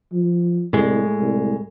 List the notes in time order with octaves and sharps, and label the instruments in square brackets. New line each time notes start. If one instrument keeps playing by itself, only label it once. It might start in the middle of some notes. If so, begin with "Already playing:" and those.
[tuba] F3
[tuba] C2 [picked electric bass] A2 G#3
[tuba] C2